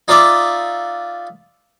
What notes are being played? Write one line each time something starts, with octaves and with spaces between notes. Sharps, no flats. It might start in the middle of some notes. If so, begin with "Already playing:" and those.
D#4 F4 D5 E5 D6